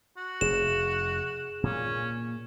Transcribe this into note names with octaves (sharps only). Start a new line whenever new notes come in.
F#4
F1 G#4 E7
A#2 A#3 C#4